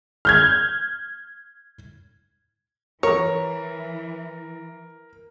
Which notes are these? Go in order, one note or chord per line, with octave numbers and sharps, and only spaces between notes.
F6 G6 G#6
E3 A#4 C#5